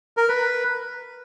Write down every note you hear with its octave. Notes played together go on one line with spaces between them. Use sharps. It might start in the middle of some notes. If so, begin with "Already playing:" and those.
A#4
B4